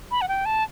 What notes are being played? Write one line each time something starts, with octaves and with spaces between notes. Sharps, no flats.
B5
F#5
G5
A5